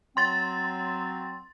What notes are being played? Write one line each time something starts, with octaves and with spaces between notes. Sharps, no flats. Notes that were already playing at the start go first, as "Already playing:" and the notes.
F#3 C4 C6 A6